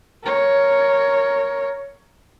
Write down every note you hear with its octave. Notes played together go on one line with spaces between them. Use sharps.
A#4 C#5